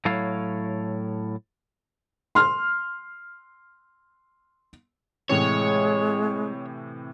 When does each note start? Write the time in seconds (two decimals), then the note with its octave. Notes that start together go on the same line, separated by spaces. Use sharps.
0.05 A2 F#3 E4 A4 C#5 F5
2.35 C6 F6
5.30 A2 C3 E3 G#3 C#5